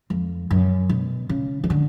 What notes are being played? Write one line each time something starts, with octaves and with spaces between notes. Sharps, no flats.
F2
F#2
B2
C#3
D#3
D3